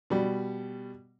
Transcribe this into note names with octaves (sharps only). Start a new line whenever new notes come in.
B2 G3